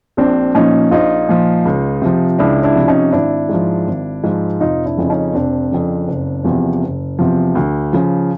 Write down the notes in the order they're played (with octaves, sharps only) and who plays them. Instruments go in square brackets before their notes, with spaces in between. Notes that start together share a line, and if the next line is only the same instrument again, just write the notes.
[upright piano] A#1 C4 D4
A#2 F3 C#4 D#4
A#1 D#4 F4
A#2 F3
C#2
C3 F3
C#2 D4 E4
D4 E4
C3 F3
C#4 D#4
G#1 D4 E4
G#2 F3
G#1
G#2 F3
F1 D#4 F4
D4 E4
F2 C#3 F3
C#4 D#4
F1 C4 D4
F2 C#3 F3
F#1
E2 C3 F3
F#1
E2 C3 F3
D2
C#3 F3